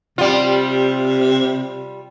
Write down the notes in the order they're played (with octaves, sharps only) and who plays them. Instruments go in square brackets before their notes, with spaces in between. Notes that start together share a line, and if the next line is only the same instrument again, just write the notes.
[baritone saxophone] C3 [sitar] G3 F4